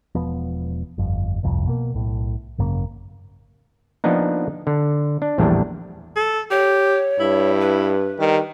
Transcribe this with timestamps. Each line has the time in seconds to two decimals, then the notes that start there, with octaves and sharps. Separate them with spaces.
0.15 E1 F3 B3
0.98 G1 F2
1.43 G1 C2 F2
1.67 B2 A#3
1.94 B1 A2
2.58 G#1 F#2 C#3 A#3
4.04 F3 A#3 B3 D4 D#4
4.67 D3
5.22 D4
5.38 A#1 E2 A2 G3 D4 A#5
6.16 A4
6.51 G4 C#5
7.20 G2 E4
7.61 B4
8.19 D#3 G3